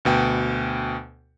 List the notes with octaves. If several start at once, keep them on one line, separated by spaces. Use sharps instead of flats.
D2 B2 G5